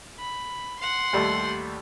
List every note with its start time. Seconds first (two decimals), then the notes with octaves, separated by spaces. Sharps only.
0.18 B5
0.80 F#5 C6
1.13 D#2 G3 A3